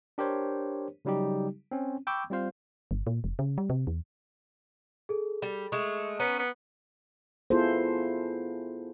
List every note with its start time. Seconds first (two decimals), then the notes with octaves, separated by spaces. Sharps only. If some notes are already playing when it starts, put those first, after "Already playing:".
0.18 D4 G4 A#4 C5 C#5
1.05 C#3 F#3 G3 D#4 G4
1.71 C4 C#4
2.07 G5 B5 C#6 D6 E6 G6
2.30 G3 C4 F4 C5 F5
2.91 G1
3.07 A#2
3.24 F1
3.39 C#3
3.58 G3
3.70 C3
3.87 E2
5.09 G#4 A4
5.42 G3
5.72 G#3 A3 C#6
6.20 B3 C#4 A#5
6.39 B3
7.50 B3 E4 F4 G#4 A4 C5